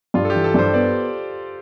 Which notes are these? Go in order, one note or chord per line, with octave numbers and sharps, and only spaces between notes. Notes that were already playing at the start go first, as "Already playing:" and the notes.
G2 F4
A4
E3 G4
A4
G2 C5
B3 D5